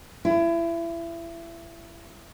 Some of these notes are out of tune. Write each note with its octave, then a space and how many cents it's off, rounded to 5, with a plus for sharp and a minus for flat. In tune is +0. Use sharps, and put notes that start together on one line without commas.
E4 +30